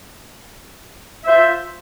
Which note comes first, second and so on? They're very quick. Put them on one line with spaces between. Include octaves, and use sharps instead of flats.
E5 C5 F4